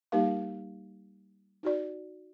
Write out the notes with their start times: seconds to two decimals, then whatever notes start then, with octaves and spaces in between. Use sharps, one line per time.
0.12 G3 A#3 D#4 G4 A#4 F5
1.63 D#4 F#4 D5